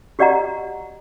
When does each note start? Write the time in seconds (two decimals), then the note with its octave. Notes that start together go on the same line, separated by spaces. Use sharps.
0.19 F#4 G4 D5 D#5 F#5 A#5